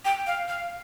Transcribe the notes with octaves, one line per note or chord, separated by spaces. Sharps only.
G5
F5
F5